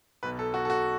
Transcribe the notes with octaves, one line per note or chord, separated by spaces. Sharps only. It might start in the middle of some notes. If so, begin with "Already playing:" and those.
B1 B2 B4
A4
F#4
A4
F#4